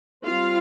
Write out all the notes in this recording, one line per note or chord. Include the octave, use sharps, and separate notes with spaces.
G3 C4 F4 F5